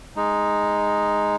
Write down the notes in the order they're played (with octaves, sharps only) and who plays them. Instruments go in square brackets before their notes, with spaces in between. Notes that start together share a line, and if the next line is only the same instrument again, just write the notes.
[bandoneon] G#3 D#4